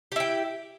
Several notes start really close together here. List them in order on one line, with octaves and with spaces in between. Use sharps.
G4 E4 G5